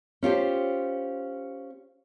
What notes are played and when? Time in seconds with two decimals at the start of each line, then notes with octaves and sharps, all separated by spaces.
0.23 C#4 F4 G4 C5